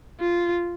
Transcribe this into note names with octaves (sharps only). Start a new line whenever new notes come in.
F4